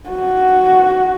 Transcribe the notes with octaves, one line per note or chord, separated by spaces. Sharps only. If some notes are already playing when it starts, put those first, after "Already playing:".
F#4